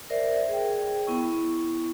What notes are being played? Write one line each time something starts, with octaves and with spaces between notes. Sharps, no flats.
A#4 C5 D5 E5
G#4 G5
B3 E4 C#6